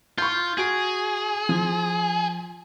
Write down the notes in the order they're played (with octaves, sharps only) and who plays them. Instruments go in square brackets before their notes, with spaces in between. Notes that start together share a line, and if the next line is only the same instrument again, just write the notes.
[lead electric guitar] F4 [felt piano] C#6 G6
[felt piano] F#4 D7 [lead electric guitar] G#4
[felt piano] F3